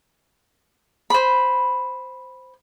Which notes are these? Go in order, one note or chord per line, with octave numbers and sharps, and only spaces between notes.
C5 B5